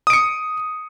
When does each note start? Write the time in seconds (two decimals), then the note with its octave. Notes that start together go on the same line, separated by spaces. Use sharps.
0.07 D#6
0.10 D7
0.13 C#7